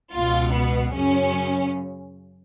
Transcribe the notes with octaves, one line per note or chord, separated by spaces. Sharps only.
C#2 B2 F4
B3
F#2 C#3 C#4